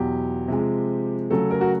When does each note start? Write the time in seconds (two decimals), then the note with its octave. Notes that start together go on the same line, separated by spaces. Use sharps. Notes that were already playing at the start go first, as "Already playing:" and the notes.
Already playing: E2 B2 F#3 G4
0.48 C3 F3 G#3
1.31 C#3 F#3 A3 A4
1.51 A#4
1.61 F#4